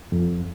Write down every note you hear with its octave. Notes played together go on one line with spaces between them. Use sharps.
F2